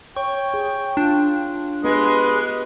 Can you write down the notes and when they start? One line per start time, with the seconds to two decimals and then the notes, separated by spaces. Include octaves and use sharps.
0.16 C#5 G5 C#6
0.54 G#4
0.97 D4 F4
1.84 G#3 B3 G4 B4